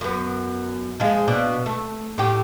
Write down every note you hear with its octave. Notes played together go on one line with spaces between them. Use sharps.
F#2 B3
F3 G#3
B2 D4
A3
A2 G4